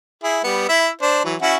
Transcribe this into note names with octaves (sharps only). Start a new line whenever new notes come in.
E4 G#4
G3 B3
E4 E5
D4 C5
E3 F#3
C#4 E4 F#4